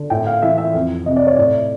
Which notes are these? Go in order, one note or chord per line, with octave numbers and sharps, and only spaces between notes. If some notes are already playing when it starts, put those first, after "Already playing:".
Already playing: D3
A2 G5
F5
E3 E5
E5
F2
C3 D#5
D5
C#5
A2 D5